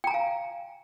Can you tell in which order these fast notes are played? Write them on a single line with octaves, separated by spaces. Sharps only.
G5 A#5 G#5 F5